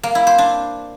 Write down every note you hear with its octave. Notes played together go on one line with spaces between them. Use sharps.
A#3
E4
C5
D4